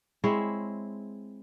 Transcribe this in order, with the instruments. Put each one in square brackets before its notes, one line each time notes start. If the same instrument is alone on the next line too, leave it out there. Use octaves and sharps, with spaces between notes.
[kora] G#3 C4 E4 C#5